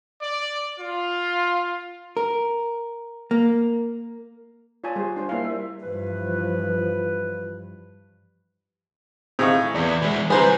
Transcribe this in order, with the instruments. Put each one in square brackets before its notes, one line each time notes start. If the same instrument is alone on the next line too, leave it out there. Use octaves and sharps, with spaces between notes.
[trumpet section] D5
F4
[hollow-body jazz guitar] A#4
A#3
[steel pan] F4 C#5 D5 G#5 A5
G3 G#4 C5
D4 C5 G#5
G3 A#3 E4 C5 F5
E5
[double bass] G2 [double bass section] E3 F3 [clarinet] B4
[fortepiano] A2 D#4 C#6 [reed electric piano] C4 G#4 F5
[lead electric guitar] E2 [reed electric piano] D5
[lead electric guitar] E3 G#3
[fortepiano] C3 E3 [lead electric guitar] G3 [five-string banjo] G#4 C5 [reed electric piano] B4 A#5